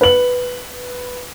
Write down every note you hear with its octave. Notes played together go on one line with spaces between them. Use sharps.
B4 F#7